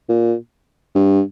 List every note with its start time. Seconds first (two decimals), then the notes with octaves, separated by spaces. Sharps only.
0.09 A#2
0.95 G2